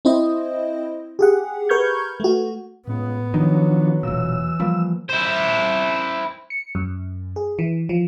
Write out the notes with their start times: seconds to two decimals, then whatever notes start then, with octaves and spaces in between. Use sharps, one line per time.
0.05 C4 E4 C5 D#5
1.19 G4 G#4 F#5
1.69 A#4 B4 C#6 F6 G6 G#6
2.20 A3 F#4
2.87 C#2 A2 B3
3.34 D#3 F3 F#3 D4
4.03 E1 A#2 E3 E6
4.60 F3 G3 A#3
5.10 E4 C5
6.50 C#7
6.75 F#2
7.36 G#4
7.59 E3
7.89 F3